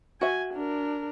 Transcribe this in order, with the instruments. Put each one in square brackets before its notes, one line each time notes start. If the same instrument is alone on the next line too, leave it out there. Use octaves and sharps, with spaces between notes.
[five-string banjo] F#4 E5 [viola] G#5
[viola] D4 A#4